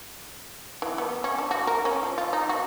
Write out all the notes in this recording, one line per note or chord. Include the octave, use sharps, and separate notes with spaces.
E3
B3
C#4
D4
F#4
A#4
C#4
F3
F4
D#4
F#4